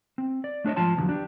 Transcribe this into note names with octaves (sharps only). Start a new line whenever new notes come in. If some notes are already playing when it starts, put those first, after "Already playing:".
C4
D5
A3 D4 G#4 C#5 D#5
G#2 F3 F4 A5 C6
E2 A2 D3 D#3 F3 F#3
D4 G4